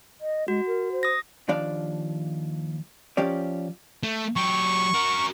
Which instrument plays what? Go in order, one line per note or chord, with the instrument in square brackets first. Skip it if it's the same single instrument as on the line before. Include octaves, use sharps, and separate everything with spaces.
[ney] D#5
[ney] G#3 [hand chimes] F#4
[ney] A#4
C5
[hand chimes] D#6 A#6
[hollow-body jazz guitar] D#2 F3 D4 D5 F5
F3 C#4 G4 D5
[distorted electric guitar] A3
[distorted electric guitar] F#3 G4 [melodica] C#6
[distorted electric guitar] F#4 A#4